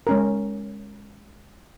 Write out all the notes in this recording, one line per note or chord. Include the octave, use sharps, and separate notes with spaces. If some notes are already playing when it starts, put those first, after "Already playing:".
G#3 C#4 A#4